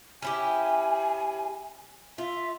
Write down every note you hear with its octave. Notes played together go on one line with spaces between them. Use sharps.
C#4 E4 G4 G#5
F4 E5